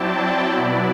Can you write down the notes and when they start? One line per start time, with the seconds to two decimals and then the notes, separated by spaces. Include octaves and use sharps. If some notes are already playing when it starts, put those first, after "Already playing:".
Already playing: F#3 C4 E4 D5 G5 A5
0.52 B2 F#3 B3 E4